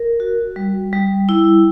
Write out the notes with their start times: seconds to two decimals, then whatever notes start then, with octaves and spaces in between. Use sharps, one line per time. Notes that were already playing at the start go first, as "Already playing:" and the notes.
Already playing: A#4
0.20 F#4
0.56 G3
0.93 G3
1.29 E4